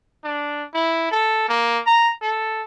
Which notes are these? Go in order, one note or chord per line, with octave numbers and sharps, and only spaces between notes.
D4
E4
A4
A#3
A#5
A4